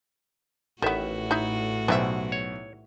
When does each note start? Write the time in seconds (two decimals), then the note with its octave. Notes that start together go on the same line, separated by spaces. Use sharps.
0.82 A1 A2 D#3 B3 F#4 E5
1.31 D#4 E4
1.88 B1 E3 G3 C5 E5
2.32 C#5